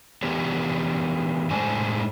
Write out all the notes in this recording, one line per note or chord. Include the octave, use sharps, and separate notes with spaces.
E3 B3 D4 G4 C#5
A2 G#3 D4 C5 G#5